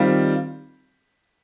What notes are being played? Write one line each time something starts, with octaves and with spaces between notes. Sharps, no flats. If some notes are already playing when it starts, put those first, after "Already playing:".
Already playing: D#3 G3 C4 F4